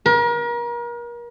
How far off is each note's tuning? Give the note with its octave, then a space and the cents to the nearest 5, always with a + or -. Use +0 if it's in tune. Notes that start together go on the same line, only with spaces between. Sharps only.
A#4 +35